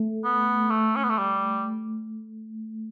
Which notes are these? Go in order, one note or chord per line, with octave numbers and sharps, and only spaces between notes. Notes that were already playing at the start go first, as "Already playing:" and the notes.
Already playing: A3
B3
A3
C#4
B3
A3
G3